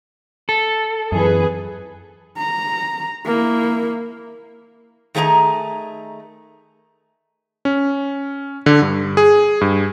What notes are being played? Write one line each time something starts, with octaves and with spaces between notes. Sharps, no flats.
A4
F#2 E3 G#4 B4
A#5
A#3 E4
D#3 A3 G#4 D5 A#5
C#4
D3
G2
G#4
G2